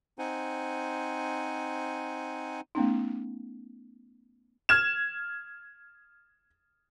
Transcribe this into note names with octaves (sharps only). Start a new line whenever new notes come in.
C4 D#4 C5 F#5 G#5
A3 B3 C#4 D#4
F6 G#6 E7